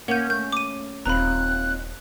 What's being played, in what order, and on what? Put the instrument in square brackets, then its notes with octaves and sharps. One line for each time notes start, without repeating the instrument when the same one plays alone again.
[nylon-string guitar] A#3 [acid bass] C#4 [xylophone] F#5 G6
[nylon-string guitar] A3 [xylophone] G6
[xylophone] D6 D#7
[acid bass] D#1 [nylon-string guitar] D#2 C4 F4 [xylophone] A#5 B5 [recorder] F#6